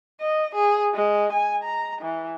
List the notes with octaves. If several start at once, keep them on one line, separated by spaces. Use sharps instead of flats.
D#5
G#4
G#3
G#5
A#5
E3